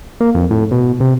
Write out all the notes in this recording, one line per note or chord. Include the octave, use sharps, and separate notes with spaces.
A#3
F2
A2
B2
C3